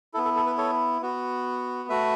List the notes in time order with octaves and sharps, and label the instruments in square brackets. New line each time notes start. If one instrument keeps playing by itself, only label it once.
[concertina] E4 A4
B3
A4
A4
B4
A4 C#5
B3 F#4
A3 F#4 B4 E5